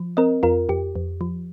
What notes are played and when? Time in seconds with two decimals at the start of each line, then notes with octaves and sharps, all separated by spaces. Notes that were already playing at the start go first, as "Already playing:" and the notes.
Already playing: F3
0.17 C4 A#4 D#5
0.43 F2 F4 A#4
0.69 F2 G4
0.96 F2
1.21 F3